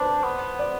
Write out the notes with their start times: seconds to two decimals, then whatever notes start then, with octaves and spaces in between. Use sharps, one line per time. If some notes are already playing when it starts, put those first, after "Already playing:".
Already playing: D4 B4 C5
0.24 B3
0.59 D5